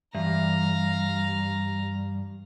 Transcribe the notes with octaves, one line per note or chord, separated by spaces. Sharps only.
G2 E3 F5 A#5